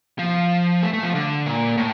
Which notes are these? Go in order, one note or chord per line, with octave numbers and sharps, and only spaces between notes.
F3
A3
A3
F3
D3
A#2
A2